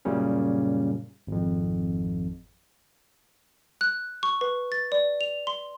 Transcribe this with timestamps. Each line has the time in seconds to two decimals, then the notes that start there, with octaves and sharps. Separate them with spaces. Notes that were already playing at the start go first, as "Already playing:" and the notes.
0.05 F#2 A#2 C#3 G3 C#4
1.27 G#1 F2
3.81 F#6
4.23 C#6
4.41 B4
4.72 A6
4.92 D5
5.21 F7
5.47 C6